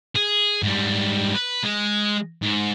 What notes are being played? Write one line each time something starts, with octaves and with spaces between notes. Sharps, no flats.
G#4
G#2 G3
B4
G#3
G#2